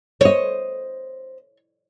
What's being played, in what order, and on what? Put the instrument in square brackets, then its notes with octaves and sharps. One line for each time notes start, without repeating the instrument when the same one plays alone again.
[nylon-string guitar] C5 D#5 [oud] C#5